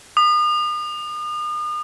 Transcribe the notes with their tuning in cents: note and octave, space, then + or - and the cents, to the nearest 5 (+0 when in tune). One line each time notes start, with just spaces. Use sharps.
D#6 -40